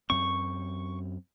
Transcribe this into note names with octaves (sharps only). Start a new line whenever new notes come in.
F#2 C4 C#6